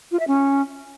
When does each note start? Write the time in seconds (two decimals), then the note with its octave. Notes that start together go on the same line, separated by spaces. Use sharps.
0.11 F4
0.19 E5
0.27 C#4